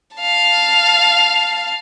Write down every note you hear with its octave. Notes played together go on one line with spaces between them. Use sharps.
F5 A5